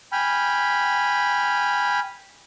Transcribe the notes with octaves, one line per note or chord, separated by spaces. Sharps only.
G5 G#5 B5 F6